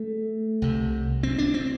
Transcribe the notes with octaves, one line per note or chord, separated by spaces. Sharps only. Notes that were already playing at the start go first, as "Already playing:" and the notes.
Already playing: A3
C2 C3
C4
D4
C4